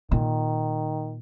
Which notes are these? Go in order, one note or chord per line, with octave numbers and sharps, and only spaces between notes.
A#2 D#3